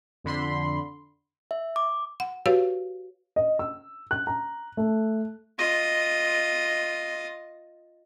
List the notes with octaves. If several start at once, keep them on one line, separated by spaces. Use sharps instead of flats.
F2 D3 B5 C6
E5
D6
F#5
F#4 G4 B4 C#5 F5
D#5
E6
F#6
A#5
A3
F4 D#5